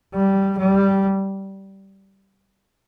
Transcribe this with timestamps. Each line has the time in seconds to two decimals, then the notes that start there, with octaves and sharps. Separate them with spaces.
0.14 G3
0.58 G3